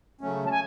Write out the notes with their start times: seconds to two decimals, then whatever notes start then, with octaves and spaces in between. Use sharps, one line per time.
0.21 C#3 F#3 A3 C#4
0.46 A5
0.51 G#5